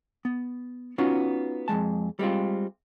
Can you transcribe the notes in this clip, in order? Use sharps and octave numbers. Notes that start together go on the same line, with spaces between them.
B3
B3 C#4 D#4 F4 F#4
F2 G#2 G#3 A5
G3 G#3 C4 F4